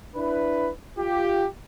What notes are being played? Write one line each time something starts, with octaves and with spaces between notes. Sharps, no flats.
D4 E4 B4
F4 G4